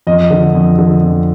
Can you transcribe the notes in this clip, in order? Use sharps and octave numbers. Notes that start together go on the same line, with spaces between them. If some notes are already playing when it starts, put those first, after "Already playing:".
F2 D#5
D3
F2
D3
F2